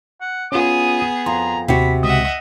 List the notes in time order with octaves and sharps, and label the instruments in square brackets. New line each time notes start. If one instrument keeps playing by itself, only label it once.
[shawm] F#5
[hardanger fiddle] B3 G#4 [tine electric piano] C#4 F4 [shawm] D#6
[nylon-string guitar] F2 [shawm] A#5 [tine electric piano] C6
[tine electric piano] D#2 [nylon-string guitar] C3 F#4 [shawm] B5
[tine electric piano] C#2 D#6 [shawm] D#5 [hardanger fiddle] E5 F#5